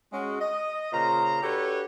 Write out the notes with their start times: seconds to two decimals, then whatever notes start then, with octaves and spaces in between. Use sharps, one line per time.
0.12 G#3 C#4 F#4
0.40 D#5
0.93 A#2 C#3 C5 A#5
1.42 D4 F#4 G4 A4 B4 C#5